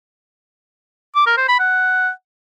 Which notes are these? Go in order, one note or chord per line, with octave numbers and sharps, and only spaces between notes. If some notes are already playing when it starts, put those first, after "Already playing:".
D6
A#4
C5
B5
F#5